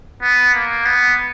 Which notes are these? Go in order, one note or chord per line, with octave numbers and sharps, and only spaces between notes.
B3
A#3
B3